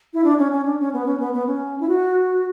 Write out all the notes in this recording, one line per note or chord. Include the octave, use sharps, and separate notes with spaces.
E4
D4
C#4
C#4
D4
C#4
B3
C#4
B3
B3
C#4
E4
F#4